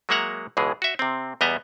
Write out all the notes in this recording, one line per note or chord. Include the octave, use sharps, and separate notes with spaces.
F#3 G#3 A#3 E5 F#5 A#5
C#2 B2 E3 G#3 G#4
F#4 E5
C3 C4
E2 G3 B3 D#5 E5 A#5